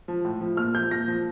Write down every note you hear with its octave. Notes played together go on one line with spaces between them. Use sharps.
F3
A2
F3
A#2 F6
F3 G6
A#2 A#6
F3